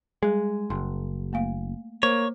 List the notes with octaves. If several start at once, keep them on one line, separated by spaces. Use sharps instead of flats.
G3 G#3 G#4
F#1 C6
A3 A#3 F5
A#3 C5 C#5